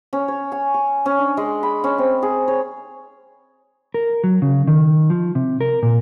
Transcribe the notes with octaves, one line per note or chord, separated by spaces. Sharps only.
C#4
C#5
G#5
C#6
C#4
D4
G#3
B5
C#4
C4
G#4
C#5
A#4
F#3
C#3
D#3
F3
C3
A#4
A#2